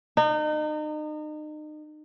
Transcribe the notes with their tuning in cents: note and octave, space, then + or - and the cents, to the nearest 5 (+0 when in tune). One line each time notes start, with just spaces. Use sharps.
D#4 -35